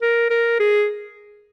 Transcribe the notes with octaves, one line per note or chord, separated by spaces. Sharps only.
A#4
A#4
G#4